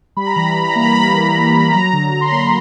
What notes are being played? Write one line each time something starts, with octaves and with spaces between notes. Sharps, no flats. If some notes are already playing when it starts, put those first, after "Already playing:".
G3 B5
A#5
E3 B5
E3 B5
A#5
A#3
B5
G3 B5
E3
E3
A#3
F#3 A#5
D3
D3
C6
B5
A#3